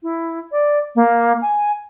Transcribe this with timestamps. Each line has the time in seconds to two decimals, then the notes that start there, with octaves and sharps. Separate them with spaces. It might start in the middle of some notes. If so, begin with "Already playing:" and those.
0.03 E4
0.52 D5
0.96 A#3
1.42 G#5